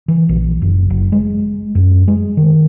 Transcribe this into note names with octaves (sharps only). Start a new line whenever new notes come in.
E3
A#1
F#1
F#1
G#3
F#2
G#3
D#3